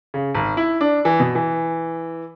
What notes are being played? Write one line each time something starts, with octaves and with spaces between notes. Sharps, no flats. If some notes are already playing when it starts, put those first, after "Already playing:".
C#3
G#1
E4
D4
E3
B2
E3